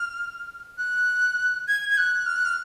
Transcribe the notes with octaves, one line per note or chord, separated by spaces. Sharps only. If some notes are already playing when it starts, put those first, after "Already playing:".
Already playing: F6
F#6
G#6
G#6
F#6
F6
F#6
F6